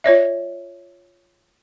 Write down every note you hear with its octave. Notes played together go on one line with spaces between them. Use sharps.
F4 C#5 D5 E5